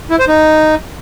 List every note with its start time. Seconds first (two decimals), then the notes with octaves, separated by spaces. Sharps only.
0.10 E4
0.19 C5
0.28 D#4